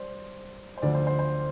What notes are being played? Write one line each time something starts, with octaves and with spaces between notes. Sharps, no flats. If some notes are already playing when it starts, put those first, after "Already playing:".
Already playing: G3 C5 D5
C5
D2 D3 F3 D5
C5
C5
C5